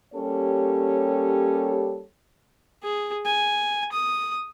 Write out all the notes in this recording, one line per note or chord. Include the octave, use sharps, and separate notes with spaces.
G3 A#3 C#4 G4 A4 C#5
G#4
G#5
D#6